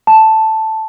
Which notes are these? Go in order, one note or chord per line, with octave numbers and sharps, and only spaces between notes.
A5